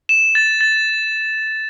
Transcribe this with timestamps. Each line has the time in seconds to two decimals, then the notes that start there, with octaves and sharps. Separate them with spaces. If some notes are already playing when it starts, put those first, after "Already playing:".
0.09 E7
0.35 A6
0.61 A6